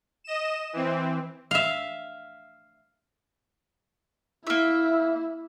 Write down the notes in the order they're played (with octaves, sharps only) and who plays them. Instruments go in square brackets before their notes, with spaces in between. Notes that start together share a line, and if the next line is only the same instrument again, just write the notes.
[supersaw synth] D#5 E7
E3 C4
[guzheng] E5 F5
[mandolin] A#3 E5 [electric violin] E4